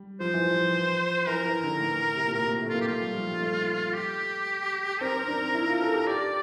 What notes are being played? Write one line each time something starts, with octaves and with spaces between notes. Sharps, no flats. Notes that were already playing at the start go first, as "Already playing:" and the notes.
Already playing: G3
F3 C5
E3
F3
E3 A#4
E3
D3
A2
C3
A#2
A2 A#4
A#2
A3
A#3 F4
G4
A3 F4
G3
F3
G3
A3
G4
C4 A#4
C4
D4
E4
F4
A4
G4
G4 D5